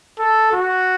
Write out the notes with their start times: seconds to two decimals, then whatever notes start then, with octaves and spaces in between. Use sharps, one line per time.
0.19 A4
0.52 F#4